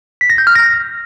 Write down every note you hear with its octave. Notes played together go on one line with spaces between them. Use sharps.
B6
A#6
G6
F6
A#6